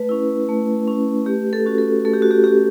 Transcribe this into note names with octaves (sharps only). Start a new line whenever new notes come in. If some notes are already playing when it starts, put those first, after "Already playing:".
Already playing: A3 B4
C#4 E4
A3
C#4 E4
A3 G4
A4
C#4 F#4
A4
A3 A4
G4
F#4
G4
C#4 F#4 G4